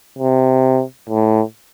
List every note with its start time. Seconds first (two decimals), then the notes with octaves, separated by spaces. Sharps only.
0.18 C3
1.10 A2